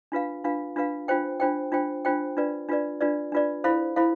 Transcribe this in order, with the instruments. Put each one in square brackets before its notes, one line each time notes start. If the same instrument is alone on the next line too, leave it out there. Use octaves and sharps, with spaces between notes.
[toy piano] D4 F4 B4 F5
D4 F4 B4 F5
D4 F4 B4 F5
D4 F4 C5 G5
D4 F4 C5 G5
D4 F4 C5 G5
D4 F4 C5 G5
D4 F4 B4 D5
D4 F4 B4 D5
D4 F4 B4 D5
D4 F4 B4 D5
E4 A4 C5 F5 B5
E4 A4 C5 F5 B5